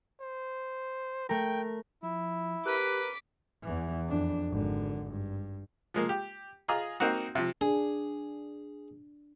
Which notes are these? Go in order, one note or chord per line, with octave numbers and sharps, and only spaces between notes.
C5
A3 A#4 G5
F3 E4
G4 A#4 B4 D6 B6
E2 E3
F2 D4
G#1 D3
G2
F3 G#3 A#3
G4
F4 G#4 D#5 A#5 D#6
A#3 C4 D#4 F#4
C3 F3
D4 G#4